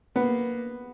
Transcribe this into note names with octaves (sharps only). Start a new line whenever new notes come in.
A#3 B3